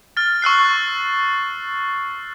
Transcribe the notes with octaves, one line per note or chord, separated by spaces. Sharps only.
F6 A6
C#6 E6 F#6 C7